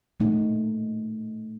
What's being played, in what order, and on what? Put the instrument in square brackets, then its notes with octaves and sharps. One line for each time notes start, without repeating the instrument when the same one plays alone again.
[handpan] A#2 A3 D#4